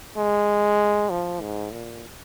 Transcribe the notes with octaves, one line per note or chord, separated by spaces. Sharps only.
G#3
F3
G#2
A#2